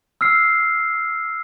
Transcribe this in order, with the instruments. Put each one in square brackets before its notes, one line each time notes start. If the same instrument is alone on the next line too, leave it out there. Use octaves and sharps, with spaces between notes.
[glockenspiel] E6 F6 C7